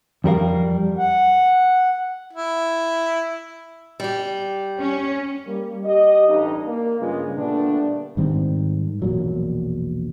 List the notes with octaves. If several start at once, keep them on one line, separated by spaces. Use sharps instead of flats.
F2 G3 A#4 F5
F#5
E4
G3 G4
C#4
G3 A#3
G4 D#5
A1 G2 D#4
A#3
G2 C#3 G#3 B3 F4
A#2 D3 G3 A3 B3 D4
G#2 D#3 G3 C4
E1 A#1 A#2 F#3